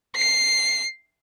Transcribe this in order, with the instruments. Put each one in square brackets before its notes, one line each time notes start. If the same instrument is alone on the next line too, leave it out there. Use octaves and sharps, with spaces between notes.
[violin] C7